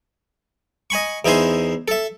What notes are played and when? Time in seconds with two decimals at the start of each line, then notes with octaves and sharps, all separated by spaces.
0.90 D#5 G#5 B5 C#6
1.25 E2 D#4 E4 C5 G#5 C6
1.88 A4 E5